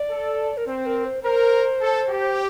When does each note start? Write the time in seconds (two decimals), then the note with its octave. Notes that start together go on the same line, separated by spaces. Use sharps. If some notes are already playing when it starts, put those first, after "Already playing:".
Already playing: D5
0.10 A4
0.57 A#4
0.67 C4 C5
0.86 A#4
1.05 C5
1.24 A#4 C5
1.81 A4
2.09 G4